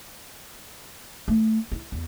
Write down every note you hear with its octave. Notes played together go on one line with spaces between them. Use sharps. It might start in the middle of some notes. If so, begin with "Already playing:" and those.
A3
E4
E2